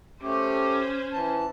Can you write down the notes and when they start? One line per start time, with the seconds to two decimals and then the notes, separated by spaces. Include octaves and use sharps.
0.22 A3 C#4 G4 C5
1.13 E3 A5